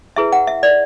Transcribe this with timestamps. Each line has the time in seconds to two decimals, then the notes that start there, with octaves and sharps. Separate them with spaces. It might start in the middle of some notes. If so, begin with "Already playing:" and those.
0.16 E4 G#4 B4 E5
0.32 F#5
0.47 E5
0.63 D5